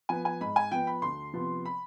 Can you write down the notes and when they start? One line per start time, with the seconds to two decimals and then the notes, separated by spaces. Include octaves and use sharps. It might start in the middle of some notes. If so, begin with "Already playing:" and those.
0.09 F3 B3 G#5
0.25 G#5
0.41 G#2 B5
0.56 G#5
0.72 F3 B3 G5
0.87 B5
1.02 D2 C6
1.34 C3 F3 B3
1.65 B5